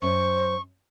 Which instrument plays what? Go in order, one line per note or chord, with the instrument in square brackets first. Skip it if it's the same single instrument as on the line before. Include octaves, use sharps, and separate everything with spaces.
[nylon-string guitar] F#2 C#4 [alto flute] C5 [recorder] C#6